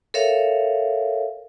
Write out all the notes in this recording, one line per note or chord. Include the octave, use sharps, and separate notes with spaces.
A4 A#4 C#5 E5 F5